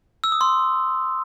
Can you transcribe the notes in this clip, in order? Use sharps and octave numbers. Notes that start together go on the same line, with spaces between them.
E6
D#6
C6